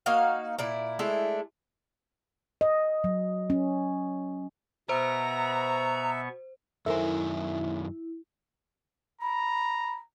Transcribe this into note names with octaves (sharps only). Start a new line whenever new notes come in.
A#3 D#4 F#4 F5
A#2 E4 D5
G#3 A3 D4 E4
D#5
F#3
C#4
B2 B3 C5 E5 A#5 C#6
F#2 D#3 E4 A4 A#4 C5 E5 G#5
A#5 B5